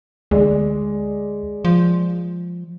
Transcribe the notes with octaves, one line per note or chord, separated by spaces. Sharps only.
D2 G#3 D5
F3